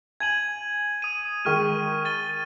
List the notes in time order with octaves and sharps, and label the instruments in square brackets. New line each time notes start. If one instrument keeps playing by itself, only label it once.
[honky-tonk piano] G#5 [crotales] G#6 D#7 F#7
[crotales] D#6 D#7
[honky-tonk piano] D#3 G#3 [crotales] C#6 F6 D#7
[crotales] A6 D#7 G7